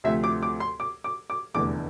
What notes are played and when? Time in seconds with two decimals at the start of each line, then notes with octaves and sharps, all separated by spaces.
0.04 D2 C3 F3 A3 E5
0.24 D6
0.43 D6
0.60 C6
0.80 D6
1.04 D6
1.30 D6
1.54 F1 E2 D3 A3 D6